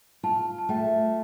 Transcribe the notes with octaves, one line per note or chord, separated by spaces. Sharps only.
F4 A5
A5
A3 G5